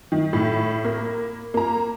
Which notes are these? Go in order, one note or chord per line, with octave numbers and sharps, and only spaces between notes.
D#3
A2
A#3
A#3 A#5